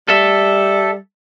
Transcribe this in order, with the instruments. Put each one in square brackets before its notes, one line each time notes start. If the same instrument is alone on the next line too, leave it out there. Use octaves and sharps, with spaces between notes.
[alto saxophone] G3 [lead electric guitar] A4 E5